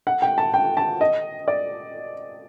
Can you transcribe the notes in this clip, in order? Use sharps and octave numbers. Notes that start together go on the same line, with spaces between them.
F#5
G5
A5
G5
A5
D#5
D5